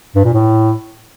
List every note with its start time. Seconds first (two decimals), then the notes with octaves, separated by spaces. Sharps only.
0.15 G2
0.24 A#2
0.33 A2